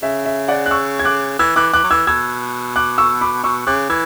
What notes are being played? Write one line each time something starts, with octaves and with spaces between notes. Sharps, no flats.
C#3 E5
E5
D5 F#5
F#6
C#6 E6
G#6
D6 F#6
E3 E6 G#6
E3 D6 F#6
E3 D6 F#6
F#3
E3 E6 G#6
B2 E6 G#6
D6 F#6
C#6 E6
B5 D6
B2 C#6 E6
C#3 D6 F#6
E3 E6 G#6